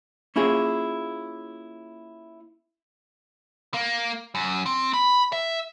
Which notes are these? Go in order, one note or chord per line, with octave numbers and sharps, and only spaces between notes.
A#3 C#4 E4 F4 G#4
A#3
F#2
C4
B5
E5